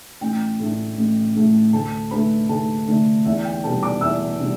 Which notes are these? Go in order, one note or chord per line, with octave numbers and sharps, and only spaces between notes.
A1 G5
A2 A3 D4
A1
A2 A3 D4
D2 A4 A5
D3 A3 D4 B4 B5
D2 A4 A5
D3 A3 D4
E2 E5
G5
B2 G3 B3 D4 A4 A5
D5 D6
E2 E5 E6
B2 G3 B3 D4